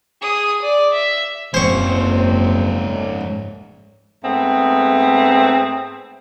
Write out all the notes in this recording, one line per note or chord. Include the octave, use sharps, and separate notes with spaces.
G#4 D#6
D5
E5
F#1 G#2 C4 C#4 C5 C#6
G#2 A3 B3 C4